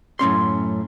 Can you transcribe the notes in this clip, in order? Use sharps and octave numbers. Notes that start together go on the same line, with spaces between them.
F#2 A2 C#4 C6